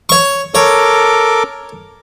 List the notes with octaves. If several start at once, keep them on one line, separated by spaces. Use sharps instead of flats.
C#5 C#6
A4 A#4 C#5 D6